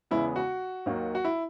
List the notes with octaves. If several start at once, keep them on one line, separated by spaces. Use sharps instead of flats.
E2 C#3 G#3 B3 E4
F#4
D#2 D#3 F#3 A#3
F#4
E4